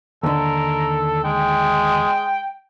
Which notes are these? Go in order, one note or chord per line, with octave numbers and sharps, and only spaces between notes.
D#2 D3 A4 A#4
G#3 G5